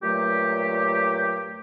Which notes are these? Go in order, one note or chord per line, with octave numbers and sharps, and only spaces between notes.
G2 A#2 F#3 A3 G4